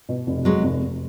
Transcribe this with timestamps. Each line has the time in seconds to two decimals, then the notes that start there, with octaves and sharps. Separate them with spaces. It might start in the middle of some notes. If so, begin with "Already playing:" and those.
0.09 B2
0.27 F1
0.45 F1 F#3 G#3
0.63 F1
0.81 F1